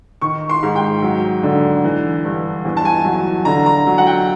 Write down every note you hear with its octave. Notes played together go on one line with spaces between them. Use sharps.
D#3 C#6
C6
G#2
G5
F#3
D3
E3
G2
E2
A5
G#5
F#3
D3 A#5
A#5
F#3
F#5
G5